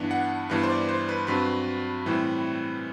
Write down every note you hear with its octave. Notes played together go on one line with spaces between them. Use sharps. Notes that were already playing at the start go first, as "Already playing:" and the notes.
Already playing: G2 E3 B3 D4
F#5
G2 E3 G3 B3
C5
D5
C5
B4
G2 F#3 C4 B4
A2 E3 G3 C4